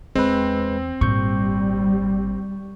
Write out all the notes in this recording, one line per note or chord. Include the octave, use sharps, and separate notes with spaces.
E2 G#3 C4 B4
G#1 A#2 G3 C#6 G6